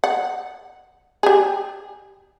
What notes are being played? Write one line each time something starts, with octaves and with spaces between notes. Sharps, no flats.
F#5
G4 G#4